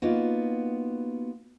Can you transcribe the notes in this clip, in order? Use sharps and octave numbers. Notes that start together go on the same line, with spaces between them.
A#3 B3 D#4 F4 F#4